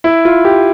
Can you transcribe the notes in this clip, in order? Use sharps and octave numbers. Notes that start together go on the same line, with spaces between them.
E4
F4
G4